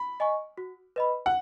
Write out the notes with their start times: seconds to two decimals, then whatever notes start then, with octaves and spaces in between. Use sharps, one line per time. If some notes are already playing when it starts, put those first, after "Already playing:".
Already playing: B5
0.20 D#5 G#5 C#6
0.58 F#4
0.96 B4 D#5 B5
1.26 F#5